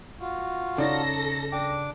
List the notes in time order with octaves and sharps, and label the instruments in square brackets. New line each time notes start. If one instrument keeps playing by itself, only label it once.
[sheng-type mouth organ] F4 F#4
[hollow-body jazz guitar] C#3 [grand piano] C#4 D#4 D5 [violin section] A4 A#6
[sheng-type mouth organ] D4 D6 [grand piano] G5